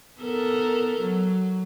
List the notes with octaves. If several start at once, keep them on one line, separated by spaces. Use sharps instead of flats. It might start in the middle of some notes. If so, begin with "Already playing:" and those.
B3 A4 A#4
F#3